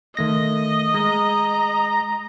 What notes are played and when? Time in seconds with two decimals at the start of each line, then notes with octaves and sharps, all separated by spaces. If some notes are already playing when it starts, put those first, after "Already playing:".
0.17 D#3 A3 D#5 A#6
0.94 G#3 A#5